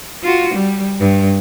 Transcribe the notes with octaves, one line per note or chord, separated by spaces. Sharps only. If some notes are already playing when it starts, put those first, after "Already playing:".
F4 F#4
G3
G2